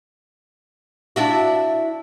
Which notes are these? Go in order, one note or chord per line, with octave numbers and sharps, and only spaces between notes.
D4 E4 F#4